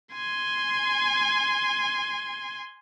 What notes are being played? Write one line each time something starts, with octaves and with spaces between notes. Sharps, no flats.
G#5 C6